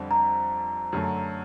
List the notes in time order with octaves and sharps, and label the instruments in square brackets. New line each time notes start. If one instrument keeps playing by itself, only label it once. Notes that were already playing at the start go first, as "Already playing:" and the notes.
Already playing: [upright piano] F2 D3 G3 C4
[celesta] A#5
[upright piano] F#2 D3 F#3 A3